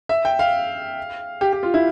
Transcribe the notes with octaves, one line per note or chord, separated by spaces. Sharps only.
E5
G5
F5
G4
G4
F4
E4